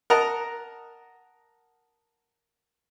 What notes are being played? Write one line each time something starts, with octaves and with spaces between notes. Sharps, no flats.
A#4 D#5 F#5 A5 A#5